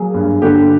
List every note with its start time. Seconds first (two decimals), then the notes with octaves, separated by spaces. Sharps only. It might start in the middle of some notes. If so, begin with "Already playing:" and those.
Already playing: F#3 A#3 G#4
0.14 G2
0.42 D3 G4